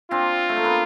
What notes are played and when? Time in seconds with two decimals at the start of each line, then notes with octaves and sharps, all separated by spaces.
0.11 C4 D4 F4
0.49 A3
0.57 A#3
0.65 B3